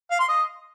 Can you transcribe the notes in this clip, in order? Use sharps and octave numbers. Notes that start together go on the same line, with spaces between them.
F5
C6
D#5